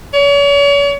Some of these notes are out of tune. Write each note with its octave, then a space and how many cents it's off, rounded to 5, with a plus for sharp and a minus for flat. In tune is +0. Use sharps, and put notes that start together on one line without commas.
C#5 +40